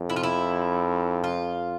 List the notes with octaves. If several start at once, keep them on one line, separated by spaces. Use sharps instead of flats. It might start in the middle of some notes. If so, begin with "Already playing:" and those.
Already playing: F2
E4
F4
E4
F4